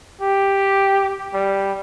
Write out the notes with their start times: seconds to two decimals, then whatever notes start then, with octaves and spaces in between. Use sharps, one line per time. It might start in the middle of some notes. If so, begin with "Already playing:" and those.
0.21 G4
1.34 G3